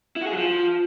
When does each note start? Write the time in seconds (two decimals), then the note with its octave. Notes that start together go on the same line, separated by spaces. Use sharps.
0.16 E4
0.22 F#4
0.27 G#4
0.32 F#3
0.37 F3